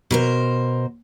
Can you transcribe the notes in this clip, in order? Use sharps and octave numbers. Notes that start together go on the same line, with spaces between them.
B2 A#4 C5